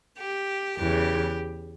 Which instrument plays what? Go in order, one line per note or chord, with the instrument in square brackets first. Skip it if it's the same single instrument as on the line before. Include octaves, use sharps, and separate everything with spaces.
[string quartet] G4
E2 C#3 E3 G4